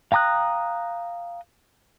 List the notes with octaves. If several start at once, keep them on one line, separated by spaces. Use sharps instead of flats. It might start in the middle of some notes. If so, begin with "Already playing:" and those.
F5 G5 A#5 D#6 F#6